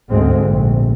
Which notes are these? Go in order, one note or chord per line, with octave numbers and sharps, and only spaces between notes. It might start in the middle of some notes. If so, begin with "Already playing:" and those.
D2 G#2 G#3 C4
A#1